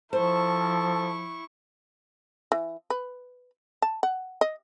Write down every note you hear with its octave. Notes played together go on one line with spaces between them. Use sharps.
F3 E4 A4 C5 C#6
E3
B4
A5
F#5
D#5